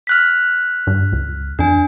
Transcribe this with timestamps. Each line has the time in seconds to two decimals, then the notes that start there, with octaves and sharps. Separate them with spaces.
0.07 F6 F#6 B6
0.87 G2
1.12 C#2
1.59 F2 D4 G#5